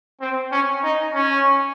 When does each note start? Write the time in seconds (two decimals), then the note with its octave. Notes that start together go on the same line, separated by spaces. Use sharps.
0.21 C4
0.51 C#4
0.83 D#4
1.13 C#4